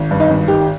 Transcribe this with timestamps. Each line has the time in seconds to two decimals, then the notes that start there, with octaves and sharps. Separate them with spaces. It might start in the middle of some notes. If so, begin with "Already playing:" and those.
Already playing: G#1
0.11 G2
0.20 D#4
0.30 G#1
0.48 D#3 G4